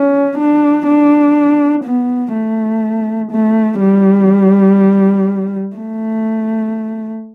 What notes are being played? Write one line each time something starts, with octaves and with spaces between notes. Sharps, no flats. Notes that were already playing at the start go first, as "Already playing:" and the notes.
Already playing: C#4
D4
D4
B3
A3
A3
G3
A3